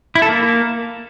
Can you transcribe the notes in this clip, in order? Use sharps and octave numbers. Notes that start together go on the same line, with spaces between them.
E4
A4
A#3